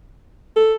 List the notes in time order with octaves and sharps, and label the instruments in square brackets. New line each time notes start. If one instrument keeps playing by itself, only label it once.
[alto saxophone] A4